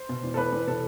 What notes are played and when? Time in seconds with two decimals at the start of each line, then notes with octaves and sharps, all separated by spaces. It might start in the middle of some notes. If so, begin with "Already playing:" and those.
Already playing: C5
0.09 B2
0.23 E2
0.34 A4
0.37 E2 B4
0.52 E2
0.67 B2 A4